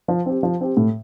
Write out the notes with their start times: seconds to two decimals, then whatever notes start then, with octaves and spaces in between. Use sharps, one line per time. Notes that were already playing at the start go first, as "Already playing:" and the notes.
0.08 F3
0.26 C4 G4
0.43 F3
0.61 C4 G4
0.77 A2